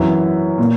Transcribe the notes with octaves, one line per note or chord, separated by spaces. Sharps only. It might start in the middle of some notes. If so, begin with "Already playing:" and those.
Already playing: F#2 E3 E4
A#2